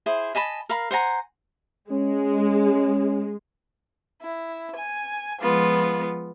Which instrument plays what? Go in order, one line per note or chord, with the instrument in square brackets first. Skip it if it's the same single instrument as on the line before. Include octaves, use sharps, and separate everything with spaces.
[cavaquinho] E4 G#4 C5
D#5 G#5 A5 B5
A#4 F5 B5
C5 F#5 G#5 A#5
[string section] G#3 [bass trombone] C#4
[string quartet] E4
G#5
F3 G#3 B3 F4